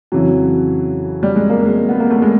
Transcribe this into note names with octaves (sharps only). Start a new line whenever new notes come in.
F2 C#3 E3 F#3
G3
G#3
A#3
G#3
B3
A#3
A3
G#3